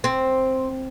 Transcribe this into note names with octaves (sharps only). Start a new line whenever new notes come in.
C4